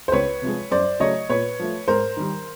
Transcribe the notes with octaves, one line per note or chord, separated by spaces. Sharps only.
C5
C#2 B4 C#5
C3 F3 G#3
F#2 C5 D5
C#3 F#3 A3 C#5 D#5
A#2 B4 C#5
F3 A3
G#2 A#4 C5
D#3 G3